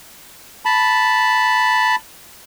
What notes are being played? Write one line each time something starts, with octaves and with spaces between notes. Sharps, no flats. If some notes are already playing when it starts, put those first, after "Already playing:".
A5 B5